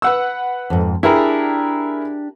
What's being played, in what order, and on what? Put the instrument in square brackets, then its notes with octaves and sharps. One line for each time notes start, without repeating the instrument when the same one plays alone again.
[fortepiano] B4 F#5 E6
[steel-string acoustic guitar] F2 G#2
[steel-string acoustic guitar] D4 G4 [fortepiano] E4 G#4 A#4